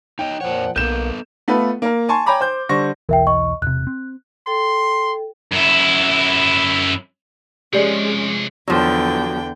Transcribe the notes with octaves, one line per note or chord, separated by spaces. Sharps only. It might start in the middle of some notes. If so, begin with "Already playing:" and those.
D#4 C#5 D#5 G5
F2 A#2 F3 C#5 F#5
B1 A#3 B3 A4 B4 G6 E7
A3 B3 F4 A4 B4
A#3 A#4
G#5 A5 C6 C#6
C#5 G5 G#5 A#5 B5 D6
C5 G6
D3 G3 C5 C#6 A#6
B1 E2 E3 A#4 E5 G5
D#5 C#6
E1 C3 F#6
C4
A4 G5 C6
F#2 E4
C3 F3 G#3 C#4 G4 D5
E2 D3 F3 F#3 G5